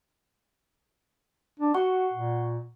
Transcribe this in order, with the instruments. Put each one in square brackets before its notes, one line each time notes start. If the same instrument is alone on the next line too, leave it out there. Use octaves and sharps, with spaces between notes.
[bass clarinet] D4
[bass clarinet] F#4 [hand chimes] F#5 C#6
[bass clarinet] A#2